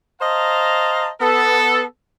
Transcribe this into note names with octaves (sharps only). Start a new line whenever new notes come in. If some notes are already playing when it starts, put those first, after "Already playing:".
C5 D#5 F5 A5 A#5
B3 A4